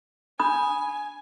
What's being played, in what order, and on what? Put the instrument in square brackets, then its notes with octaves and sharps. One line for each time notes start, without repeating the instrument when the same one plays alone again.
[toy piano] D4 B5 D#6 [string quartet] G#5